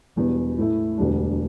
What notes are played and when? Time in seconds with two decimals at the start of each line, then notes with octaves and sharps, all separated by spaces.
0.16 E1 E2 B2 G3
0.58 A2 A3 E4
0.98 E1 D2 D3 G3 D4